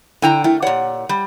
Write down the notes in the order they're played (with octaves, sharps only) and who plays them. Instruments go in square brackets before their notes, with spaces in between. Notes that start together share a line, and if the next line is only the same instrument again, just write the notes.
[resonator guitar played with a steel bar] D3 G5 A#5 [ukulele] E4
[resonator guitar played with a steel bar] A3 [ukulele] E4 A#4 G5
[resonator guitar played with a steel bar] A#2 F#5 [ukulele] G4 C#5 D5
[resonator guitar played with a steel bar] G3